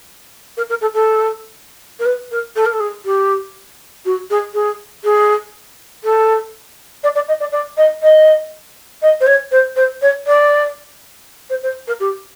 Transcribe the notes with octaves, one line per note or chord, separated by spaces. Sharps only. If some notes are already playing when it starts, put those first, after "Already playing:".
A#4
A#4
A4
A4
A#4
B4
A#4
A4
A#4
A4
G#4
G4
F#4
G#4
G#4
G#4
A4
D5
D5
D#5
D5
D5
D#5
D#5
D#5
C5
C#5
C5
C5
C#5
D5
C5
C5
A#4
G4